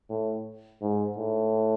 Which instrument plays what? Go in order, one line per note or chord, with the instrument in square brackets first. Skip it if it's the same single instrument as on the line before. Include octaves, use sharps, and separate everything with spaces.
[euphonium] A2
G#2
A2